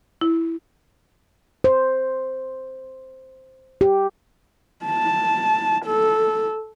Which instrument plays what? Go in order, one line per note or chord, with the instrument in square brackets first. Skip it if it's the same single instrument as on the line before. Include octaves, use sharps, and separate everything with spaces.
[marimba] E4
[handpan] C5
G4
[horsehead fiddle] A5
A4